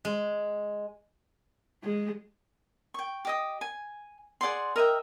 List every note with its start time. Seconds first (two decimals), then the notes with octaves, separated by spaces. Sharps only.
0.05 G#3
1.83 G#3
2.94 G5 C#6
3.25 G4 D#5 D#6
3.61 G#5
4.41 G#4 D5 F#5 C6
4.76 A#4 D#5 E5 G5